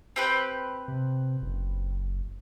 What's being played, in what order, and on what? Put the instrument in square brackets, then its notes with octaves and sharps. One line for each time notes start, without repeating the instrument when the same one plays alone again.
[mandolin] C4 G4 B4
[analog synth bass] C3
F#1